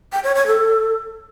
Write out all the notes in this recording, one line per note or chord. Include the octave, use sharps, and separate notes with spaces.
G5
C#5
C#5
A4